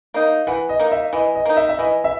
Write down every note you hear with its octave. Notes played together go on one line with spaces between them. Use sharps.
A#3 D#4
E3 F#5
D#5
A#3 D#4
E5
E3 D#5
D#5
A#3 D#4
E5
E5
E3 D#5
E5